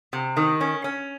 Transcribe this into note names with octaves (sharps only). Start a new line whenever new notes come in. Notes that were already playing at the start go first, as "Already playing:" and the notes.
C3
D#3
C#4
C#4